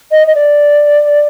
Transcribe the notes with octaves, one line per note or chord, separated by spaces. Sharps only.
D#5
D#5
D5